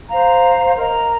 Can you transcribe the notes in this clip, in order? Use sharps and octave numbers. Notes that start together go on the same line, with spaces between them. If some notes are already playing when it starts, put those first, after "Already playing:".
C5 F5 A#5
A#4 D#5 A#5